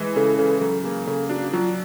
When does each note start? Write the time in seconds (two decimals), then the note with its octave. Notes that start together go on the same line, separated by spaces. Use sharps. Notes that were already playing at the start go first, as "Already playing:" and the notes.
Already playing: E3 G#3
0.16 C#3 A4
0.39 C#3 A4
0.61 F#3 A4
0.84 A#3 G#4
1.07 C#3 A4
1.29 D4 F#4
1.53 F#3 F4